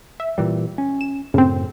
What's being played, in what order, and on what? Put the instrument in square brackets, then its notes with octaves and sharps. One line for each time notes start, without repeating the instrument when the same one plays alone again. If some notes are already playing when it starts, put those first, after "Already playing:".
[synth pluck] E5
[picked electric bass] A#2 E3 G3
C#4
[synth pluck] E7
[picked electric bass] F#2 A2 [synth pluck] C#3 C4